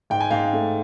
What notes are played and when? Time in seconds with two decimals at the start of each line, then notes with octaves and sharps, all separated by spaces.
0.10 G#2 G5
0.20 G#5
0.31 G#2 F5 G5
0.53 A3